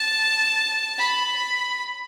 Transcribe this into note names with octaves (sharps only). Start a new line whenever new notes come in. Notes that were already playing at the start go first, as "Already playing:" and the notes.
Already playing: A5
B5